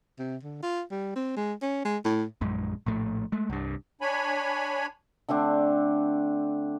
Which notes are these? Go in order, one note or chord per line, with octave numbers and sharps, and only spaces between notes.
C3
D3
F4
G3
C4
G#3
C#4
G#3
A2
A#1 F#2 G#3
A#1 A2 A3
G#3 A3
C2 G2
D4 C#5 G#5 B5
D3 A3 C4 D4